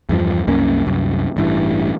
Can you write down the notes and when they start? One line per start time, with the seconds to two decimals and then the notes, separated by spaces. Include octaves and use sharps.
0.09 E2 G2 F3
0.47 C2 F#2 A#3 C#4
0.86 C2 F#2
1.37 A1 G2 E3